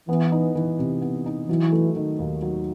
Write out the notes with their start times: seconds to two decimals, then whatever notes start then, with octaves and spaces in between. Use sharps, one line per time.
0.09 E3 B3
0.32 D#4
0.55 E3
0.79 C3
1.02 B3
1.26 D#4
1.48 E3 F#3
1.72 A3
1.96 D#3
2.19 D#2
2.42 F#3